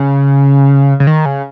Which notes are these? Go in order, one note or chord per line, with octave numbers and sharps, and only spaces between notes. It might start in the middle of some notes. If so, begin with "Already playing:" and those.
Already playing: C#3
C#3
D#3
C#3